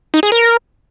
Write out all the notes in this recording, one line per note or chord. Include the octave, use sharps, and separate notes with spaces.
D#4
G#4
A#4